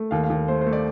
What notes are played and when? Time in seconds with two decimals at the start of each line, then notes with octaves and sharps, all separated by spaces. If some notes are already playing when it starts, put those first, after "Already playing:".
Already playing: A3
0.11 D#2 F5
0.24 F5
0.30 D#2
0.48 A3 C5
0.61 C5
0.66 A3
0.73 D5